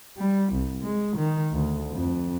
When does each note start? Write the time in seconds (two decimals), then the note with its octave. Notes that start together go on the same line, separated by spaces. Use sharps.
0.18 G3
0.53 C2
0.83 G#3
1.17 D#3
1.53 D2
1.93 F2